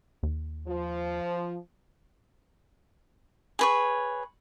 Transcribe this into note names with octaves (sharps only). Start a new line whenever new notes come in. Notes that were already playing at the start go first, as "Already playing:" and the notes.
D#2
F3
G#4 B4 C#5